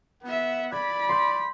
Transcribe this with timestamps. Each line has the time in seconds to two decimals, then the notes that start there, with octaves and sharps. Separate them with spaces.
0.23 B3 E5 F#5
0.72 D5 B5 G#6
1.09 C6 G6